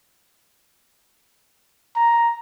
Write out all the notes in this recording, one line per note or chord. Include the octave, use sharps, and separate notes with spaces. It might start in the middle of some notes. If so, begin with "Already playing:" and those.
A#5